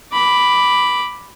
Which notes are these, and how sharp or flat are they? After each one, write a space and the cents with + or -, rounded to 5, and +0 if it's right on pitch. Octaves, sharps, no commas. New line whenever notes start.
B5 +0 D6 +0